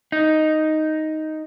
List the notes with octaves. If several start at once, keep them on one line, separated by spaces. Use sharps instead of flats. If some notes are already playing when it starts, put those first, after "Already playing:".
D#4